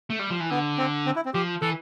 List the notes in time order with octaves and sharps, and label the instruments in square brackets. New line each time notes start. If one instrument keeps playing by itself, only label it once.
[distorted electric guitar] A3
G3
F3
E3
[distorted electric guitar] D3 [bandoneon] B3
[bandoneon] C4
C4
E4
C4
[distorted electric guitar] F3 [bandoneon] G4
[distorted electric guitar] E3 [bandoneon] A4